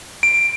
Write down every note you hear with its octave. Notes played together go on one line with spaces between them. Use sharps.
D7